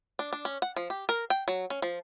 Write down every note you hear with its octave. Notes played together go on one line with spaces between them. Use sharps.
D4
D4
C#4
F#5
F3
G4
A#4
G5
F#3
C#4
F3